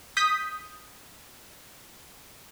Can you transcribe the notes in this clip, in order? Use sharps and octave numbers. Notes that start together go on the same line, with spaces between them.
D#6 G6 B6